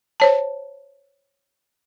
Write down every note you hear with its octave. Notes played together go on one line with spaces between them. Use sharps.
C5 C#5 A5